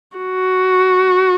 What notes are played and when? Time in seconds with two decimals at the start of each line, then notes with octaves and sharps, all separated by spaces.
0.17 F#4